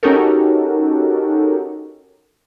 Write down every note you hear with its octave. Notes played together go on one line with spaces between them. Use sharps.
C#4 D#4 F#4 G4 A4 A#4